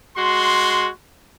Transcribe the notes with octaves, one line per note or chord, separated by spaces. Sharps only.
G#3 F#4 C6